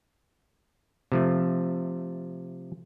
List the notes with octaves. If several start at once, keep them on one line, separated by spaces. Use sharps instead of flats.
C3 F3 A3